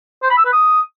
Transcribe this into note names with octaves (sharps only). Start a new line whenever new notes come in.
C5
B5
E6
B4
D#6